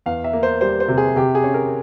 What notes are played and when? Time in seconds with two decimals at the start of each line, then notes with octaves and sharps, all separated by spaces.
0.06 E2 F5
0.24 E5
0.33 A#3
0.43 C5
0.61 G3 C5
0.80 C5
0.88 C3
0.98 G#4
1.16 C3 G4
1.35 G#4
1.44 C#4
1.54 A#4